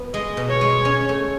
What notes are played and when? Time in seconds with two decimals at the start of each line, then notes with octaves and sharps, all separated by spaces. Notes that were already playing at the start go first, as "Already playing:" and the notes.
Already playing: B3
0.14 G#3 D#5
0.37 B2
0.49 C#5
0.61 G#3
0.85 C#4
1.09 A3